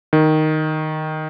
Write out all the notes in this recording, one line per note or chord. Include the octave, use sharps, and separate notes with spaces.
D#3